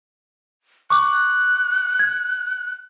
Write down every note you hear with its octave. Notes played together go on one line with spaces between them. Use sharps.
C#6 D6 F#6
G#6